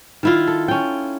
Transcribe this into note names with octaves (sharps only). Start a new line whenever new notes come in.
D#3 E4 F4
A4
C#4 G5